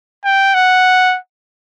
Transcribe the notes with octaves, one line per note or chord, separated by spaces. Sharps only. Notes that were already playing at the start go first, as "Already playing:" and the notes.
G5
F#5